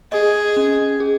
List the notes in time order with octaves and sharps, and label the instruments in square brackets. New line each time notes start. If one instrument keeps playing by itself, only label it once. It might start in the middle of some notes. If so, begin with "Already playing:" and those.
[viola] G#4 [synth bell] D#5
[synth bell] C#4
G#4